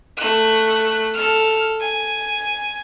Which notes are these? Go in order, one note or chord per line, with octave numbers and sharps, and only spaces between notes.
A3 F#6
A4 F6
G#5